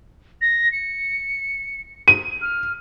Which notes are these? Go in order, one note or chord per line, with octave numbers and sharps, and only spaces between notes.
A#6
C#7
D#7
F6